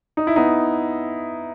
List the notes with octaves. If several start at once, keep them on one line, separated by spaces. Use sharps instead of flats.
D#4
E4
B3 D#4